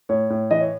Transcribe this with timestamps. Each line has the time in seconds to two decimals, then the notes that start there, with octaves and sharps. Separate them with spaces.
0.09 A2 C#5
0.30 A2
0.51 E3 D#5
0.61 C#5